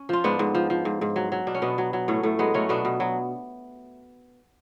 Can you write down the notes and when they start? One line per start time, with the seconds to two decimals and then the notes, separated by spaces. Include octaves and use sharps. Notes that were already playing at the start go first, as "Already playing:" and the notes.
Already playing: C#4
0.09 F3 F4
0.24 G#2 B3 D4
0.39 G#2
0.55 F3
0.70 F3
0.85 G#2
1.01 G#2
1.16 F#3
1.32 F#3
1.47 B2 D4
1.55 C#4
1.62 B2 B3 D4
1.78 F#3
1.93 F#3
2.08 A2 A3 C#4
2.23 A2 A3
2.39 F#3 G#3 B3
2.54 F#3 A3 C#4
2.69 B2 B3 D4
2.85 B2
3.00 F#3